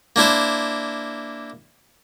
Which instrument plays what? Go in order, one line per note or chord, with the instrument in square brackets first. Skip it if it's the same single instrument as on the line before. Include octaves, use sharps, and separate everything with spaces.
[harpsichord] A#3 D4 E4 C5